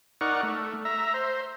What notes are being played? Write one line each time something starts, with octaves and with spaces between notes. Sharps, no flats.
D#4 A#4 D5 F#5 C#6
A3
E5 A#5
C5